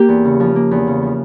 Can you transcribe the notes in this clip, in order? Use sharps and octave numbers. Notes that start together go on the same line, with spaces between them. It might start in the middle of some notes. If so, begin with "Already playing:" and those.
Already playing: A#3 G4
E2
C#3
F3
A#3
E2
C#3
F3